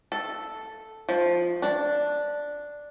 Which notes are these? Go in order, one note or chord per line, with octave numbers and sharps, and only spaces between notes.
A4
F3
D4